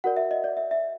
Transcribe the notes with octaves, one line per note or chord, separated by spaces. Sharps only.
F#4 A#4 D5 F#5
E5
D#5
D5
E5
E5